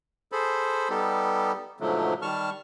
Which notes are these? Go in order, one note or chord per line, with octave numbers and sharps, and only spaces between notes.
G#4 A4 C5 B5
G3 B3 D#4 G4 A4
G#2 B2 D3 F3 F#3 A3
D#3 G3 A5 C#6 F6